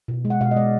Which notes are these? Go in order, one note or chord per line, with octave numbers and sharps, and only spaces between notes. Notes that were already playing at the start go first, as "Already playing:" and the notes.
B2
G#3
F#5
B2 F5
D#5
G#3 D5